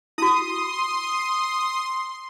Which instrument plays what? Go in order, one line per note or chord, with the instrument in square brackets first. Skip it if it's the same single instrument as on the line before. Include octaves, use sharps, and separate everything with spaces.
[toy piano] E4 F#4 [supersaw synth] C6 [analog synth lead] D#6